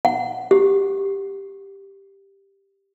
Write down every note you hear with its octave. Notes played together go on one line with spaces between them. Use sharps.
F#5
G4